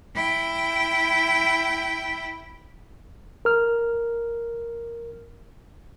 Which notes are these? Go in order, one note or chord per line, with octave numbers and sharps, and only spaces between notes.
E4 G5
A#4 F6